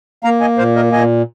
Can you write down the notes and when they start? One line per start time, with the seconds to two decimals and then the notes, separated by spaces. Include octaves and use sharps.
0.24 A#3 F5 A#5
0.41 D#5 G#5
0.58 A#2 C5 F5
0.76 A#4 D#5
0.92 A#2 D#5 G#5